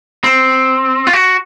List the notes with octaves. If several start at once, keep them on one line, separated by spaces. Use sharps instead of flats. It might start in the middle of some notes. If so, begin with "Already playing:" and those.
C4
F4
F#4